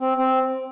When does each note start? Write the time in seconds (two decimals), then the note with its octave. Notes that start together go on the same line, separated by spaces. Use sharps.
0.01 C4
0.18 C4